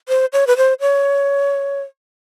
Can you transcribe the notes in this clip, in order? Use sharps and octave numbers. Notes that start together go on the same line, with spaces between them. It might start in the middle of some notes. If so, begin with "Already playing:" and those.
C5
C#5
B4
C5
C#5